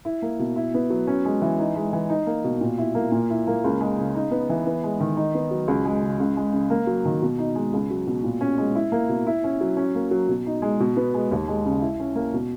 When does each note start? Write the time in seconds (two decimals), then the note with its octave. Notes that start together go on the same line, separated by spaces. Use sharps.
0.05 E4
0.22 A#3
0.39 B2
0.56 E4
0.74 B3
0.90 F#3
1.07 C#4
1.25 G#3
1.42 E3
1.60 D#4
1.75 G#3
1.93 E3
2.10 D#4
2.27 A#3
2.44 B2
2.61 A#2
2.78 E4
2.95 A#3
3.12 A#2
3.30 E4
3.47 A#3
3.64 C#2
3.81 G#3
3.98 C#3
4.15 D#4
4.31 B3
4.49 E3
4.66 B3
4.83 G#3
5.00 D#3
5.17 D#4
5.35 B3
5.51 F#3
5.68 C#2
5.85 G#3
6.03 C#3
6.20 C#2
6.37 G#3
6.53 C#3
6.70 A#3
6.87 F#3
7.05 D#3
7.22 B2
7.38 D#4
7.55 G#3
7.73 C#2
7.90 F#3
8.07 B2
8.23 A#2
8.41 C#4
8.58 G#3
8.75 E4
8.92 A#3
9.09 B2
9.27 E4
9.44 C#4
9.61 F#3
9.77 C#4
9.95 A#3
10.11 F#3
10.29 B2
10.46 D#4
10.62 G#3
10.80 B2
10.97 B3
11.14 G#3
11.31 D#2
11.48 G#3
11.66 C#3
11.82 E4
12.00 C#4
12.16 A#3
12.34 B2